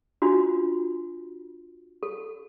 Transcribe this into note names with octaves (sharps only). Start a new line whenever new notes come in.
D4 F4 F#4
A4